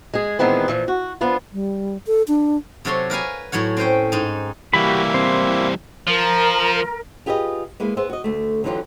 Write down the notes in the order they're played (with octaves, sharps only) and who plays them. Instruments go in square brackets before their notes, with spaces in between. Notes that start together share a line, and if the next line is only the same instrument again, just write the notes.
[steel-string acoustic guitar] G#3 G#4
A#2 D#3 E3 G#3 B3 C4
A#2 E3 F3
F#4
F3 B3 D4 F4
[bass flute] G3
A4
D4
[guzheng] C3 F#3 F#4 A4 C#5 C6
A#4 B4 F5 G#5
A2 F#3 C#5 F#5
C4 C#4 C5 G5
G#2 D#4
[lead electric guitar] E3 G3 [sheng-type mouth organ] A#3 E4 [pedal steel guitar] F#4 G4 B5
[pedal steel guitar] C4 C5
[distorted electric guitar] F3 [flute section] A#4
[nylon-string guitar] F4 G4 G#4 B4 D5 D#5
G#3 A#3 E4 B4
B3 G#4 C5 E5
F#4 D#5
D2 A3
D3 E3 F#3 D#4 F4 G4